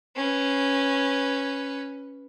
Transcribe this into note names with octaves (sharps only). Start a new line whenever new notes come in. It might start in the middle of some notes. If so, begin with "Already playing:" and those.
C#4 B4